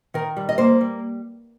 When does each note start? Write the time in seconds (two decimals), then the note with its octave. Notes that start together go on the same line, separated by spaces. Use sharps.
0.14 D#3 A#4
0.37 G3
0.49 D#5
0.58 A#3 C5
0.81 G3